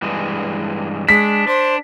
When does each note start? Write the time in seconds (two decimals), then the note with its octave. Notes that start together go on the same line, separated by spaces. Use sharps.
0.02 G2 E3 G#3
1.09 G#3 D4 B6
1.47 D4 C5